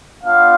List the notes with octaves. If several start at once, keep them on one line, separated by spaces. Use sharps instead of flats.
B3 D4 F4 F5